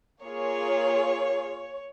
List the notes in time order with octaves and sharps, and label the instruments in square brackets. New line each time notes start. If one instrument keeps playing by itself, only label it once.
[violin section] A#3 F4 G#4 C#5